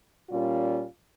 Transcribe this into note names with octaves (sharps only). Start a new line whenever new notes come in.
A#2 G3 C#4 F4